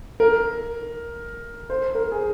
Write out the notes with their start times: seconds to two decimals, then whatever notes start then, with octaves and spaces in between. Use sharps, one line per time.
0.20 A#4
1.70 C5
1.95 A#4
2.12 G#4